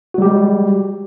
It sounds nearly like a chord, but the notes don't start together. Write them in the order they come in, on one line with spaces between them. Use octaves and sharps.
F#4 G3 G4 G#3